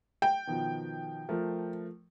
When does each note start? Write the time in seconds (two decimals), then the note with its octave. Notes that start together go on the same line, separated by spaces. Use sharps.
0.22 G5
0.47 B2 D#3 F3
1.29 F3 A3 A#4